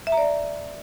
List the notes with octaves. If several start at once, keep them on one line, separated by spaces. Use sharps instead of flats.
E5
A#5
D5